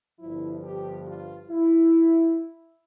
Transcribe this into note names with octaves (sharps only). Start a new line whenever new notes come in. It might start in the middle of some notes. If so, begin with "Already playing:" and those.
G1 G2 F3 E4
G4
F4
E4